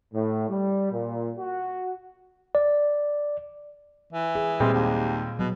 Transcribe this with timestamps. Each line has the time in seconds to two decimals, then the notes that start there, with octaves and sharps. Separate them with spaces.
0.14 A2
0.47 G3
0.91 A#2
1.37 F#4
2.55 D5
4.13 E3
4.35 G#4
4.60 A#2 G3 G#3 C4
4.73 D#2
5.39 B2 F#3